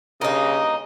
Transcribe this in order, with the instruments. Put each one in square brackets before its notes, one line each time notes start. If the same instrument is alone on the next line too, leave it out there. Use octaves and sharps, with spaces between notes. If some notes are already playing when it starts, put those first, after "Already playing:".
[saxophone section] G2 D#5 [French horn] C#3 [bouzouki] A#3 D#4